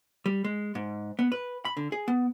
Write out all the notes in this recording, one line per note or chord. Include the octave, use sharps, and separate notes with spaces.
G3
G#3
G#2
B3
B4
B5
D3
G#4
B3